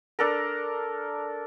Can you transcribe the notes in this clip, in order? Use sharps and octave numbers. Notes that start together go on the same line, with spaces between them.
D4 A4 A#4